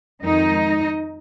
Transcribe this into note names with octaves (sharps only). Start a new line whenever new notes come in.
F2 D#3 G#3 D#4 D#5